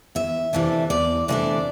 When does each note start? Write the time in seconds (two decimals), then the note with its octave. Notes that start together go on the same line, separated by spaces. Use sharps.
0.15 E2 E5
0.53 C3 E3 A3 D4
0.90 E2 D5
1.28 C3 E3 A3 D4 D5